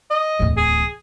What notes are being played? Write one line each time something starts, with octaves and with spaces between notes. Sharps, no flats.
D#5
D1 E2
G#4